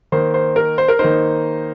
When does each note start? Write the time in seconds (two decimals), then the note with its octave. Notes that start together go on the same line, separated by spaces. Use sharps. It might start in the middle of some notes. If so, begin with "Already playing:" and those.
0.12 D#3 A#3 D#4 C5
0.34 C5
0.56 A#4
0.78 C5
0.88 A#4
0.99 D#3 A#3 D#4 C5